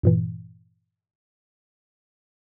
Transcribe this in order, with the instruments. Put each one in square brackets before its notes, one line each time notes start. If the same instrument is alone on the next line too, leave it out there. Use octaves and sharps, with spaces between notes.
[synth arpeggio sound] G2 A#2 E3